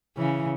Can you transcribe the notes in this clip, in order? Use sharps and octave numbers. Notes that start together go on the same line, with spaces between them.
C#3 E3